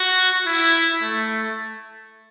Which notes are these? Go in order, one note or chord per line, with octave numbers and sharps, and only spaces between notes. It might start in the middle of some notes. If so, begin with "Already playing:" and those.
Already playing: F#4
E4
A3